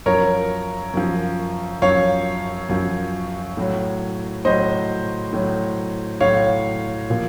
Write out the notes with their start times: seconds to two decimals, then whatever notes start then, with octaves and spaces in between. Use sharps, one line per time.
0.06 F#2 F3 A#4 C#5
0.94 F#2 F3
1.82 F#2 F3 C#5 F5
2.69 F#2 F3
3.57 A2 F#3
4.45 A2 F#3 C5 D#5
5.33 A2 F#3
6.21 A2 F#3 C#5 F5
7.10 A#2 F3